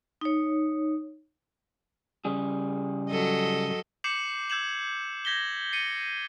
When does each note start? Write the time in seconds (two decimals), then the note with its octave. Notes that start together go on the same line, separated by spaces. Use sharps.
0.21 D#4 C#5
2.25 C#3 G3 G#4
3.09 F#3 A4 D#5
4.04 D6 G6 C7 C#7 E7 F#7
4.50 E6 G6 G#6 E7 F#7
5.25 G6 G#6 A#6 B6 G7
5.72 A6 C7 C#7 D#7